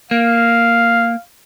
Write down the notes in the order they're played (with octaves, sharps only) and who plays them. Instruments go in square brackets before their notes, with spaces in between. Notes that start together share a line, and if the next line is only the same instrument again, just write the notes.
[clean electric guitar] A#3 [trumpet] F5